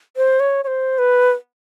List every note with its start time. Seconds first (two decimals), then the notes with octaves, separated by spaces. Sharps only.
0.17 C5
0.40 C#5
0.64 C#5
0.67 C5
0.98 B4